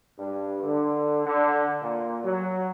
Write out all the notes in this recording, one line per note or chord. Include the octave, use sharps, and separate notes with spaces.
G2
D3
D3
A#2
F#3